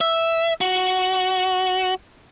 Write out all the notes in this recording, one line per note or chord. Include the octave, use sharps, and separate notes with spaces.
E5
F#4